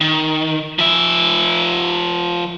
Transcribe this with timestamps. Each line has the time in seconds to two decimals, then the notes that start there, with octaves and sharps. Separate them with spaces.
0.01 D#3
0.79 F3 E5